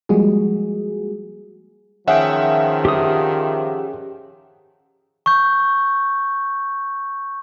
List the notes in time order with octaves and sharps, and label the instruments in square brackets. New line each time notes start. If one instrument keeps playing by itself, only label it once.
[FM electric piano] F3 G3 G#3 A#3 F#4 G#4
[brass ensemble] D#3 F3 [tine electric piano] C#4 G#4 G5 [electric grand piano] E5 F#5
[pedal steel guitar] G4 D#6
[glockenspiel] C#6 G6